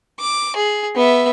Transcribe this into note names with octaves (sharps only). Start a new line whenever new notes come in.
D6
G#4
B3 E5